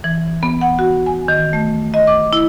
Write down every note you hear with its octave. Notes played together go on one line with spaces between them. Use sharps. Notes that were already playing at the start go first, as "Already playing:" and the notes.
E3
B3
F#5
F#4
G#5
D#3
A3
D#5
D6
E4